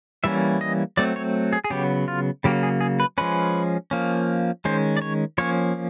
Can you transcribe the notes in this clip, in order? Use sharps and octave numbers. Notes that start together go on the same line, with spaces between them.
E3 G3 A#3 C#4 E5
D#5
F#3 A3 C4 D5
C#5
G#4
G#4
C#3 F#3 B3 G4
F4
C#3 F#3 A#3 G4
G#4
G#4
B4
F3 G#3 C#4 B4
F3 A#3 C#4
D#3 G#3 C#4 C5
D5
C#5
F3 A#3 C#4 C#5